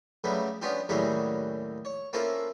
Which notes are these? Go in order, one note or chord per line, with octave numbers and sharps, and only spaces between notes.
C#3 F#3 G3 A3 B3
B3 C#4 D4 F4 G4
D#2 A2 F#3 G3 C#4 G#4
C#5
A#3 C4 C#4 E4 F4 A4